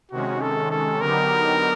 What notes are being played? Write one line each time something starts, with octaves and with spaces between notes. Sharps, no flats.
C3 D#3 G#3 C#4 F#4
A4
A4
D3 F#3 B3 D#4 G4 A#4